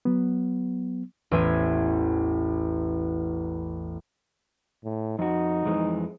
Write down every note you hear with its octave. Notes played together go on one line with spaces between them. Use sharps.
F#3 B3
A1 E2 C#4 C5 E5 G#5
A2
F2 D#4 F#4
F2 E3 G#3